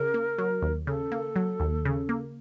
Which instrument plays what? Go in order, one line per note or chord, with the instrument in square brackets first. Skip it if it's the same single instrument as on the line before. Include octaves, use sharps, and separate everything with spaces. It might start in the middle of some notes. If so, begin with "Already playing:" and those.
Already playing: [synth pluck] C#3 [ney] A#4
[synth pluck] A#3
F#3
D#2
[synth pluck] C#3 [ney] A4
[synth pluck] A#3
F#3
D#2
C#3
A#3